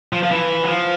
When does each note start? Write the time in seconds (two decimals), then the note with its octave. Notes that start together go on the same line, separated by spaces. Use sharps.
0.13 F3
0.23 F3
0.31 E3
0.63 F#3
0.68 F3